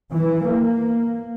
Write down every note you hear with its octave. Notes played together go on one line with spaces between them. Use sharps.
E3
A#3